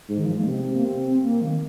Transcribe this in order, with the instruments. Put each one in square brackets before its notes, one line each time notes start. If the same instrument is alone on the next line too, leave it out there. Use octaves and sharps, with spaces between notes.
[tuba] G#2
[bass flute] D#3
F3
G#3
A#3
[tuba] C3 [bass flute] C4
[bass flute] A#3
C4
A#3
D#3